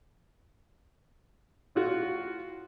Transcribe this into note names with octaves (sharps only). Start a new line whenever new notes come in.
A2 F4 F#4